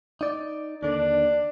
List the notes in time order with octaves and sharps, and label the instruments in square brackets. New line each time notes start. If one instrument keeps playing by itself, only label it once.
[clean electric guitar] D#4 D5
[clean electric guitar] D#2 D3 [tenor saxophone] D4